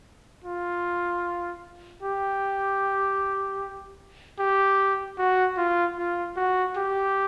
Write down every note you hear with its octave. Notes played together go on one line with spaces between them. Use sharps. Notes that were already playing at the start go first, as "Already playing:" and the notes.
F4
G4
G4
F#4
F4
F4
F#4
G4